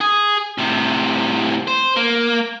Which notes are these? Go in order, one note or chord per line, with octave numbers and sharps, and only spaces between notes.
G#4
A2 C3
C5
A#3